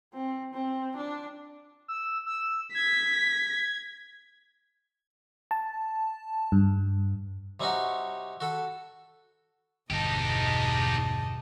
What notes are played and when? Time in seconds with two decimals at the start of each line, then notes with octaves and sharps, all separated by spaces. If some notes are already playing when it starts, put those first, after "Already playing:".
0.14 C4
0.53 C4
0.97 D4
1.88 E6
2.26 E6
2.75 G#6 B6
5.51 A5
6.52 G2
7.60 C3 G3 C4 C#4 D#4 F#4
8.40 F#4 A4 B5
9.90 G1 E2 B2 D#4 G4 D#5 A5